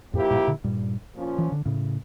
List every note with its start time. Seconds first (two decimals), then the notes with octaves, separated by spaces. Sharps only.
0.13 F2 A2 F3 A#3 E4 G4 A#4
0.31 G2 A#2
0.47 A#2 D3
0.64 G2 A#2
1.15 A#2 F3 C#4 F4
1.38 E3
1.52 D3
1.66 A2 C#3